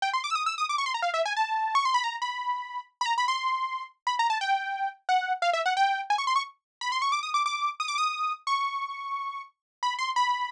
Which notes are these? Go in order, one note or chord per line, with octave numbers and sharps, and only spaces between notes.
G5
C6
D6
E6
D#6
E6
D#6
D6
C#6
C6
A#5
F5
E5
G#5
A5
C#6
C6
B5
A#5
B5
B5
A#5
B5
C6
B5
A#5
A5
G5
F#5
F5
E5
F#5
G5
G#5
C#6
C6
C#6
B5
C6
C#6
D6
D#6
D6
D6
D#6
D6
D#6
C#6
B5
C6
B5